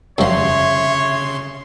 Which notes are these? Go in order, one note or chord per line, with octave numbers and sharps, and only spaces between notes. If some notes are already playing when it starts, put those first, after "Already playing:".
F#2 C#3 F3 C#5 E5 C6